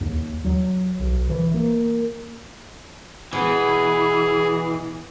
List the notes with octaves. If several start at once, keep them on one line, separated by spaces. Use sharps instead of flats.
D#2
F#3
B1
E3
A#3
B2 E3 B3 G#4